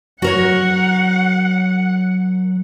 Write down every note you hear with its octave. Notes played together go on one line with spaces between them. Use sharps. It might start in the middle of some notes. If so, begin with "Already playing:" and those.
F#3 F#4 A#4 C#5 F#5